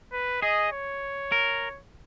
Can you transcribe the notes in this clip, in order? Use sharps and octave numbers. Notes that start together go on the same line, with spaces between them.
B4
G#4 D#5
C#5
A#4